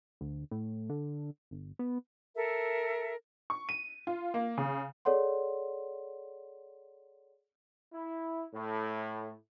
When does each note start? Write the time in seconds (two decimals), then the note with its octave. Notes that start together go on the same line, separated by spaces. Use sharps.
0.21 D2
0.51 A2
0.90 D3
1.51 G1
1.79 B3
2.36 A4 A#4 E5
3.50 C#6
3.69 D#7
4.07 F4
4.34 A#3
4.58 C#3
5.05 G#4 A4 C#5 D5 F#5 C6
7.94 E4
8.54 A2